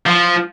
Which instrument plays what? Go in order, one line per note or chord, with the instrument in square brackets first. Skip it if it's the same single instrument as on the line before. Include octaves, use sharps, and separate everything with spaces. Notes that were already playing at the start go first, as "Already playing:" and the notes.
[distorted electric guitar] F3